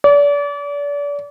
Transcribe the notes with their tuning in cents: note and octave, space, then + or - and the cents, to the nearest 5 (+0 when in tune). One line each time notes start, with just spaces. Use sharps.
D5 -35